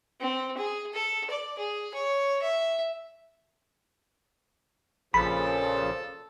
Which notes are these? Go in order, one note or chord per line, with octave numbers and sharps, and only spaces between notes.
C4
G#4
A4
D5
G#4
C#5
E5
A#1 A#2 C#3 F3 A4 B5